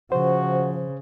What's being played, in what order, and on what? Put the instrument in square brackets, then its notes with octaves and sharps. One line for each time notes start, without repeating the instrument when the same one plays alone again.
[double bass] C#3 [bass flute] F3 [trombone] F#4 [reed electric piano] C5